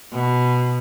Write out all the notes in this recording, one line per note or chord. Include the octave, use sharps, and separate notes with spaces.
B2